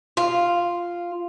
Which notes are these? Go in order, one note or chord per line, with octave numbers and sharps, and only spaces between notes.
F4